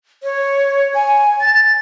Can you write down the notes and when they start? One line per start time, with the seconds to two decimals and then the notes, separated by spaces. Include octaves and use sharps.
0.23 C#5
0.94 G#5
1.41 A6